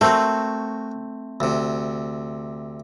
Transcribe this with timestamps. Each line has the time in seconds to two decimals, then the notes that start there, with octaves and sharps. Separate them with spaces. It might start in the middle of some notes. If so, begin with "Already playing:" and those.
0.01 A3 C4 F#4 A#4
1.40 D2 C3